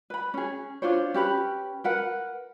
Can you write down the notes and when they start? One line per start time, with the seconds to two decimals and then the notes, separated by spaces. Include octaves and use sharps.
0.10 B4 B5
0.34 C#4 G#4
0.82 D4 F4 C5 C#5
1.14 C#4 G4 B4 B5
1.84 A#4 B4 F#5